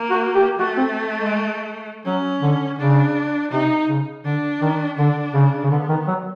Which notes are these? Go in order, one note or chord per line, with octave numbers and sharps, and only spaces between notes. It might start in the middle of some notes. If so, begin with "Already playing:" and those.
Already playing: A#3
F#4
G4
A3 F#4
C4
G#3
F#3 C#4
D3
C#3 D4
C3 D#4
C#3
D3 D4
D#3
D3 D4
C#3
C#3
D3 B3
D#3
F#3